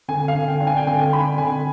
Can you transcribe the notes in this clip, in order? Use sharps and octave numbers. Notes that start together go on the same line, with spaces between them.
D3 G#5
F5
D3
G5
D4
G#5
G5
D3 G#5
D4 B5
D3 G#5